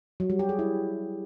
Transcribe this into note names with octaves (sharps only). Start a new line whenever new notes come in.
F#3
G3
G4
G#4
E4